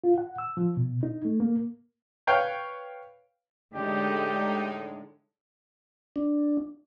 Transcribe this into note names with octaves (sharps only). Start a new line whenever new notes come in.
F4
F#5
E6
F3
B2
D#4
A3
A#3
B4 C#5 F5 G5
A2 D3 G#3 D#4 G4
D4